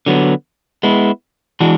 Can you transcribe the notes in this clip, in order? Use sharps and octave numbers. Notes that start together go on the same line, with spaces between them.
D3 F#3 B3
G#3 B3 E4
E3 G#3 D4 F#4